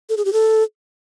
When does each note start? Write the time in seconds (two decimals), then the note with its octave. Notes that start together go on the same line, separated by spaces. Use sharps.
0.09 A4
0.17 G#4
0.25 G4
0.33 A4